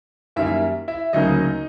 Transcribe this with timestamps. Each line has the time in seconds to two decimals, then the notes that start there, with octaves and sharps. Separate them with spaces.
0.36 F#2 D#3 G3 A#3 E4 E5
0.88 E4 E5
1.13 D2 C#3 F#3 A#3 D#4 D#5